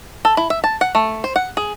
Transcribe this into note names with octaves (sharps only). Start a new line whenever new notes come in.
A4
E4
E5
A5
F#5
A3
C5
F#5
G#4